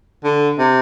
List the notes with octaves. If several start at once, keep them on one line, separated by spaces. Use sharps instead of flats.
D3
C3